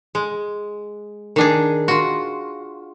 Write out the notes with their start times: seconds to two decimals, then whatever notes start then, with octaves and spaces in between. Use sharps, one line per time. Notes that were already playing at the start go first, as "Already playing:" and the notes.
0.15 G#3
1.36 D#3 D4 G#4
1.88 F4 F#4